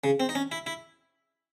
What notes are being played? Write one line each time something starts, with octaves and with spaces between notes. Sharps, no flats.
C#3
C4
D#4
C#4
E4
E4